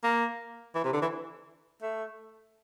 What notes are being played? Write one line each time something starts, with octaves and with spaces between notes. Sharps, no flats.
A#3
E3
C3
D3
E3
A3